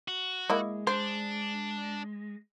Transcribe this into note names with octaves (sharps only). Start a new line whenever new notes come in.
F#4
G#3 A#3 E4 D#5
D4 C5